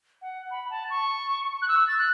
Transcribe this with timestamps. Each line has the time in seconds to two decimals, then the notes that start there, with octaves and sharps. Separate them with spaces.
0.22 F#5
0.51 B5
0.70 A5
0.90 C#6
1.62 F#6
1.68 E6
1.88 A6
1.98 F#6